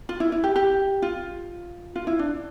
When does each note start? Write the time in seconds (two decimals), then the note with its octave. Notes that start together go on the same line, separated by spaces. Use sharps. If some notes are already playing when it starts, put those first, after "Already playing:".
0.09 F4
0.20 E4
0.32 E4
0.44 G4
0.56 G4
1.02 F4
1.96 F4
2.07 E4
2.19 D4